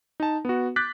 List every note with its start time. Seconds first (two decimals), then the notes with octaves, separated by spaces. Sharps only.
0.20 D#4 A5
0.45 B3 F#4
0.76 D6 F#6 G6 A6 B6